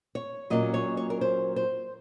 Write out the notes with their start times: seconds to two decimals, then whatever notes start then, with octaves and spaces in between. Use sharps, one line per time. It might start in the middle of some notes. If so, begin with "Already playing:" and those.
0.15 C#5
0.50 A#2 F#3 A#3 C#4 D#5
0.74 C#5
0.97 C#5
1.10 A#4
1.21 C5
1.56 C5